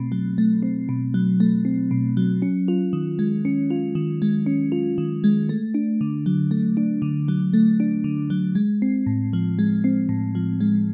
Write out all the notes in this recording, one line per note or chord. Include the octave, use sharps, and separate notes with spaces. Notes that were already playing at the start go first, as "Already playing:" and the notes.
Already playing: B2 A3 C4
F#3
A3
C4
B2
F#3
A3
C4
B2
F#3
C#4
F4
D#3
G#3
C#4
F4
D#3
G#3
C#4
F4
D#3
G#3
A3
D4
D3
F#3
A3
D4
D3
F#3
A3
D4
D3
F#3
G#3
C4
A2
F3
G#3
C4
A2
F3
G#3